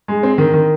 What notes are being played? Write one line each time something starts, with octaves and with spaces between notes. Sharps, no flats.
G#3
C4
D#3
D#3